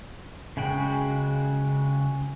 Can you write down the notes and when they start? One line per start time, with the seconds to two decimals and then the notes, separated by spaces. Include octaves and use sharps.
0.57 C#3 G#3 F#4 G5